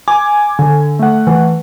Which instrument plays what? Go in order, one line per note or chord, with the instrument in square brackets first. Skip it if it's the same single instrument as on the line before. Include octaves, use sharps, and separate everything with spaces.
[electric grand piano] G#5 [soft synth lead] D6
[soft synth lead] D3
[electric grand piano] A3 F#5
[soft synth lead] E3